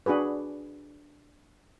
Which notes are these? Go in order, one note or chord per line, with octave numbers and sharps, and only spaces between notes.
D4 F#4 G#4 B4